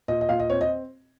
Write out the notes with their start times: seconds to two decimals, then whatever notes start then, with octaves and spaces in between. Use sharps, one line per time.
0.08 A#2 D#5
0.21 D#5
0.29 A#2 F5
0.40 D#5
0.50 C4 C#5
0.61 D#5